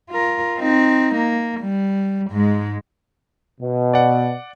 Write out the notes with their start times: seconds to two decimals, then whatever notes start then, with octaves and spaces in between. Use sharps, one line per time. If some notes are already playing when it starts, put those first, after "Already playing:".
0.11 F4 A#4
0.60 C4 D#4
1.15 A#3
1.61 G3
2.31 G#2 G#3
3.61 B2
3.94 D5 F#5